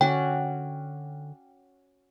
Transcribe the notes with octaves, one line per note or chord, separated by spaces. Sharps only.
D3 C#4 F#4 D5 G5